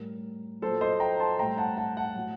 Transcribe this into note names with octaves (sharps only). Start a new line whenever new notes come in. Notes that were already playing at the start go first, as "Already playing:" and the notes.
Already playing: A2 G3 A#4
A#2 F#3 A4 C5
C5 D#5
G5 A#5
A5 C6
A2 G3 G5 A#5
F#5 A5
F#5 A5
F#5 A5
A2 F#3